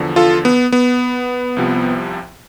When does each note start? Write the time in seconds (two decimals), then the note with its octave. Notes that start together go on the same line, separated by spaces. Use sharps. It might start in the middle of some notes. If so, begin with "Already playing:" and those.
Already playing: E2 D3 F3
0.16 F4 A4
0.45 B3
0.72 B3
1.56 C2 C3 F3